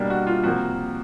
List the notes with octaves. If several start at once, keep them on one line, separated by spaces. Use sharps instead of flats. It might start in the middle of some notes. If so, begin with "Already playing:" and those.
Already playing: B2 G3 A#3 D4
F#4
F4
C3 F3 A#3 F#4